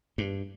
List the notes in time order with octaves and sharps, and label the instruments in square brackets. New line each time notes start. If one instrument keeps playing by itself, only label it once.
[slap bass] G2